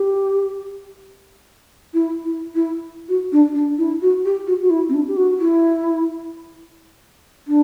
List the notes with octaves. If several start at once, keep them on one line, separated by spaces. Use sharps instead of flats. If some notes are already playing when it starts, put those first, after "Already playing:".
Already playing: G4
E4
E4
E4
F#4
D4
D4
E4
F#4
G4
F#4
F#4
E4
C4
D4
G4
F#4
E4
D4